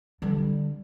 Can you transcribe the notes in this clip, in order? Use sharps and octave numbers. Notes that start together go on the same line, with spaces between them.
D3 G3